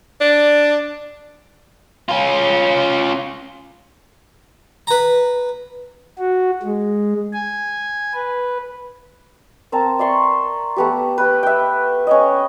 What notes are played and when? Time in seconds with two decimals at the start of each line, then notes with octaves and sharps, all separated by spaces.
0.21 D4
2.09 C#4 F4
4.87 B4 A#5
6.19 F#4
6.63 G#3
7.33 G#5
8.14 B4
9.72 C4 A#4 A5
9.99 D5 E5 C6 C#6
10.76 A3 B3 G4
11.18 B4 G5
11.43 E5 G5
12.07 C#4 C#5 D#5